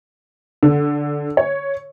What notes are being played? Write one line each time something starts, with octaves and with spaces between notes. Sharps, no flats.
D3
C#5